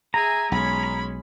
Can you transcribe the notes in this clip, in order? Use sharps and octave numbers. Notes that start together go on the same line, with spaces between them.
G#4 E5 G#5 A#5
B1 G#3 C#4 B5